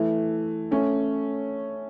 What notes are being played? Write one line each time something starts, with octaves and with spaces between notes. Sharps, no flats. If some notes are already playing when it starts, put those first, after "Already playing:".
Already playing: E3 A3
A3 C#4